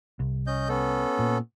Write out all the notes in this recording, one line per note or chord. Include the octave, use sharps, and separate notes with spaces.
C2
C#4 D#5 G6
B3 C#4 A4
A#2